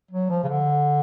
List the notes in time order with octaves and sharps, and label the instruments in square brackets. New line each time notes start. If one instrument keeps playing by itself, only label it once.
[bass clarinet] F#3
F3
C#3
D3